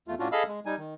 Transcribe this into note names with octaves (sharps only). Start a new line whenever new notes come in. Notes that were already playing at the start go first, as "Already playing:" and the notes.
E2 A3 F4
A2 C#4 D4 F4 F#4
G#4 A4 D#5 F5 B5 E6
G#3
G3 D#4 G#5
D#3